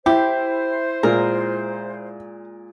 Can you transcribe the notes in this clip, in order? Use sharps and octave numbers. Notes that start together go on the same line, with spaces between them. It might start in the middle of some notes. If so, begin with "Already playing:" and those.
E4 G4 C5
A#2 G#3 A#4